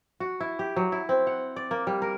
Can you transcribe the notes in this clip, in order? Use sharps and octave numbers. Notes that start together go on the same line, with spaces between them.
F#4
E4
G4
F#3
E4
C4
F#5
D5
A#3
G3
A#4